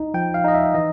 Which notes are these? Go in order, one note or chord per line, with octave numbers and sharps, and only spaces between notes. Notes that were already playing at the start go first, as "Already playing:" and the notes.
Already playing: D#4
F3 G5
F5
D#4 D#5
E5
E3 D#5